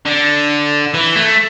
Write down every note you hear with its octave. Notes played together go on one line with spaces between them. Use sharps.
D3
E3
A3